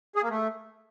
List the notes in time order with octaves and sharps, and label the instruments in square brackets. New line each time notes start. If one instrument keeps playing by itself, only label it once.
[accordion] G#4
A#3
A3